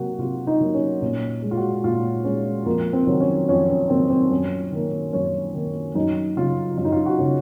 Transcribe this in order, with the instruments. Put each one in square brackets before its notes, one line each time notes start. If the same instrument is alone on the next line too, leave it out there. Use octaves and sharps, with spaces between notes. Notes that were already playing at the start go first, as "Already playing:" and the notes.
Already playing: [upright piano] C3 F#3 A#3 F#4
C3 F4
D#4
F#3 A#3
C#4
A#2 C#4
G#3
F4
F#4
A#2 F4
G#3 C#4
F2 A#3
C4
D#3 F#3 A#3
C#4
F2 C#4
C#4
D#3 F#3 A#3 C4
C4
F#2 C#4
D#3 A#3
F#2 C#4
D#3 A#3
F#2 D#4
C#3 F#3 F4
F#2 F4
D#4
F4
F#4
C#3 F#3